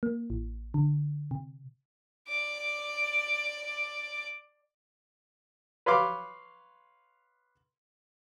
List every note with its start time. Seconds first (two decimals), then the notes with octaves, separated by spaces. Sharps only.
0.03 A#3
0.30 A1
0.74 D3
1.31 C3
2.28 D5 D6
5.86 B4 C#5 F5 C6 D6